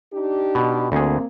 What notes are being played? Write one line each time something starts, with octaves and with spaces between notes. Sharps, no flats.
D4 D#4 G4
B2
D2 A#3 C4 G#4